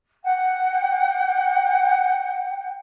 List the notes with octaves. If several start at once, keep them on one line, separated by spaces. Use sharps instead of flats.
F#5 G5